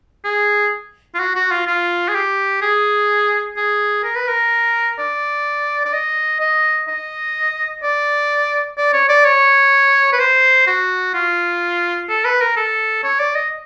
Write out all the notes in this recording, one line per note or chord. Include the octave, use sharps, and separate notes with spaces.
G#4
F4
F#4
F#4
F4
F4
G#4
G4
G#4
G#4
A#4
B4
A#4
D5
D5
D#5
D#5
D#5
D5
D5
C#5
D5
C#5
B4
C5
F#4
F4
A4
B4
A#4
A4
C#5
D5
D#5